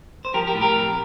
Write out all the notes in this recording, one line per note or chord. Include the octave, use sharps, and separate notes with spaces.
C5
F3 G4 A#4
G4 A#4
A2
G4 A#4
F2